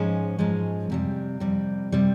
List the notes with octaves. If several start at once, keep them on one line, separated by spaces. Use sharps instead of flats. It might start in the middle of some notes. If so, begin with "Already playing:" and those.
Already playing: G#2 F3 G#3 C#4
G#2 F3 G#3 C#4
F2 C3 G3
F2 C3 G3
C3 G3